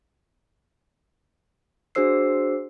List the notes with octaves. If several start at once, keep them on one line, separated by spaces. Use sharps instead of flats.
D4 F#4 G#4 C5 E6 C7